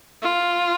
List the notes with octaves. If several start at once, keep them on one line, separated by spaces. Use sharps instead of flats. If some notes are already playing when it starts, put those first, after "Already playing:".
F4